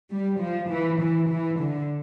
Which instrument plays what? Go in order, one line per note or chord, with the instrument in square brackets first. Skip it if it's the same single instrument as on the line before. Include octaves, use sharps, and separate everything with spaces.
[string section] G3
F3
E3
E3
E3
D3